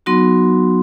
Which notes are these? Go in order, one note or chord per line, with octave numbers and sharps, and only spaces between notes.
F#3 B3 D#4 F#4 C6